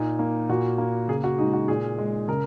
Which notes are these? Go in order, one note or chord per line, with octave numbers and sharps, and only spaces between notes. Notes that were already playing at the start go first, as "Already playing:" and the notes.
Already playing: A#2 D#4
A#3
A#2 F#4
A#3
C#3 G#4
F#4
G#3 D#4
F#4
A#2 G#4
G#3
C#3 A#4